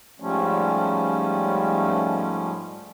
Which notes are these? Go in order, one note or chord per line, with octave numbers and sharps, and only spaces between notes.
G#2 F3 G3 A3 C#4